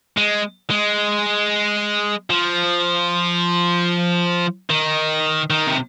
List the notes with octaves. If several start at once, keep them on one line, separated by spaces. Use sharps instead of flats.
G#3
G#3
F3
D#3
D#3
C3